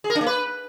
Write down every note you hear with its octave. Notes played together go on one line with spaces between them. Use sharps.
G#4
A#4
D4
A#3
B4